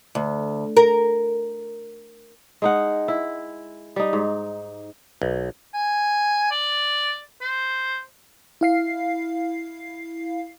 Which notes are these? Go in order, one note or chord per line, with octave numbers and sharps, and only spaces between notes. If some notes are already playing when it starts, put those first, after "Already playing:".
D2
A#4
G#3 D#4 F#5
E4
G3 D#4
G#2
B1
G#5
D5
C5
E4 F5 C7